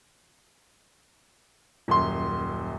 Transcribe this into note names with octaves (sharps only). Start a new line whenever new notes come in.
D#1 F#2 C6